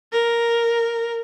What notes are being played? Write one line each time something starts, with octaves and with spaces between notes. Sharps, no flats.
A#4